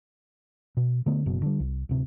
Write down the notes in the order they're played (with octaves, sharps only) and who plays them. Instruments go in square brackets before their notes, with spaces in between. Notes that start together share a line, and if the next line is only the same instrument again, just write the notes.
[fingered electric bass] B2
D3 A3 B3
F#1 F#2 B2
D3 G3
C2
D1 C3